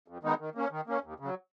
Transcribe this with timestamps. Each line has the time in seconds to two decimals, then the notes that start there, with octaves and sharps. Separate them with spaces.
0.08 F2
0.23 D#3 G#3 B3 D#4
0.40 D#3
0.55 A#3 C#4
0.71 D#3
0.87 A#3 C#4
1.04 D#2
1.20 C#3 F#3